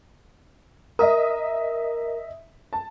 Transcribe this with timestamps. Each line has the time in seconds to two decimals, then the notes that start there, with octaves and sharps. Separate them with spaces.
0.99 A#4 D#5 E5 D#6
2.73 A5